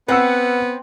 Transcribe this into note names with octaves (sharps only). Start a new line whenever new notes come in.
B3 C4 B4 F#5 E6